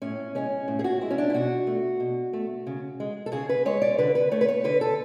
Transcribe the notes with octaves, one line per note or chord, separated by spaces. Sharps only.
A2 C#4
G#3 C#4
A2
G#4
F#4
G#3 E4
C#4
D4
E4
B2 F#4
A3
B2
A3
C#3
G#3
A4
C#3 G#4
B4
G#3 C#5
D5
D3 B4
B4
A3 C#5
B4
C#5
D3 B4
A4